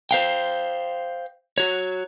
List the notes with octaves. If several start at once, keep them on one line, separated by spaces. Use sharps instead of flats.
C5 F5 G5
F#4 C#5